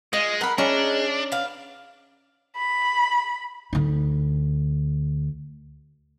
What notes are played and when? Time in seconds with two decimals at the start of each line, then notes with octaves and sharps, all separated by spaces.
0.13 G#3 F4 D#5
0.41 A#4 F#5 B5
0.58 G#3 C#4 D4 E4 A#5
1.32 B4 F5
2.57 B5
3.73 D2 D#4